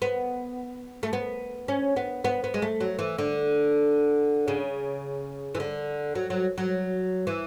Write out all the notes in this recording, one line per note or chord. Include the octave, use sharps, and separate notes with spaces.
B3
A3
B3
C#4
B3
B3
B3
G#3
A3
F#3
E3
D3
C#3
E3
D3
F#3
F#3
F#3
E3